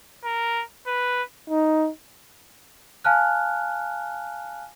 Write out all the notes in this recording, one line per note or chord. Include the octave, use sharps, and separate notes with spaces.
A#4
B4
D#4
F5 G#5 A5 F6 F#6